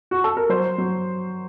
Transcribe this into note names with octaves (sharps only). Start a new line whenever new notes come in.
F#4
A4
A#4
F#3 C5
F#3